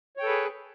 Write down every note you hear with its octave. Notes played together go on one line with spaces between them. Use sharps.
G#4 A4 B4 C#5 G5